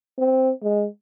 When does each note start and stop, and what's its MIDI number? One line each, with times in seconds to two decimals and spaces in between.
0.18 0.51 60
0.63 0.86 56